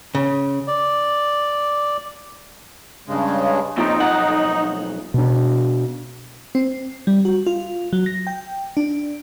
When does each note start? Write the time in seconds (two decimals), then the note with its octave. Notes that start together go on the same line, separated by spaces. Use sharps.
0.15 C#3
0.67 D5
3.08 G2 C#3 G#3
3.77 A#2 F3 C4 D#4
3.99 B1 F2 F#5
5.14 B2 D4
6.55 C4
7.07 G3
7.25 F#4
7.46 F4
7.93 F#3
8.06 A#6
8.27 G5
8.77 D4